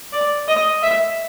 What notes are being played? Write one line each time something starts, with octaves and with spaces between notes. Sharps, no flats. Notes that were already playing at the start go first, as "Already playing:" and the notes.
D5
D#5
E5